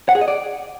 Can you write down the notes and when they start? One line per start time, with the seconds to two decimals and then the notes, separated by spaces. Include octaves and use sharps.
0.09 F#5
0.15 G#4
0.21 D#5
0.28 D5